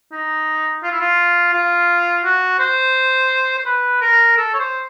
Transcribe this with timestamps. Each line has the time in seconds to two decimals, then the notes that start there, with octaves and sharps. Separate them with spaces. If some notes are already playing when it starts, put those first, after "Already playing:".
0.12 D#4
0.83 F4
0.92 E4
1.00 F4
1.53 F4
2.24 F#4
2.59 C5
3.59 C5
3.66 B4
4.01 A#4
4.37 A4
4.54 C#5
4.59 C5